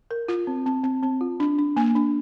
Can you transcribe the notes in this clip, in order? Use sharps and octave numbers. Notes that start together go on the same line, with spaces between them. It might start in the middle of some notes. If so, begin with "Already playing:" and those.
A#4
F4
C4
C4
C4
C4
F4
D4
D4
A#3
D4